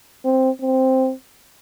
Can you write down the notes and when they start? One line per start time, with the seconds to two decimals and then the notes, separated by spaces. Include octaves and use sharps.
0.25 C4
0.61 C4